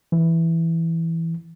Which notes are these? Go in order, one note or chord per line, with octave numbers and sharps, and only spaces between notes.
E3